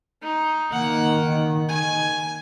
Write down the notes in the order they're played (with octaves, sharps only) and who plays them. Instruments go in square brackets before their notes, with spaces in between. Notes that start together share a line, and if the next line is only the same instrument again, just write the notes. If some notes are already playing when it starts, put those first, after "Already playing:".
[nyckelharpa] D#4
[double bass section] D#3 [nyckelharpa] A#3 F#5
[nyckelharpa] G#5